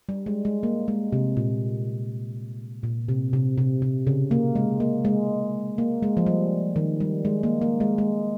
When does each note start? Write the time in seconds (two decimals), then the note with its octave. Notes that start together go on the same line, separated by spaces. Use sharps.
0.09 G3
0.26 G#3
0.45 G#3
0.63 A#3
0.88 G#3
1.12 C3
1.37 A#2
2.83 A#2
3.09 C3
3.33 C3
3.58 C3
3.82 C3
4.07 C#3
4.31 A#3
4.55 G#3
4.80 A#3
5.05 G#3
5.78 A#3
6.03 G#3
6.17 F3
6.26 G3
6.76 D#3
7.00 G3
7.25 G#3
7.43 A#3
7.62 A#3
7.80 G#3
7.98 G#3